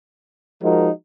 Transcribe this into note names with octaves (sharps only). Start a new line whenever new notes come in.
F3 G#3 D#4 F#4 A#4